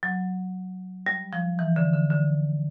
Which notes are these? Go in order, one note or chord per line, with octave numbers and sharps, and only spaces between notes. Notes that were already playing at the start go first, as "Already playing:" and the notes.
F#3
G3
F3
E3
D3
D3
D3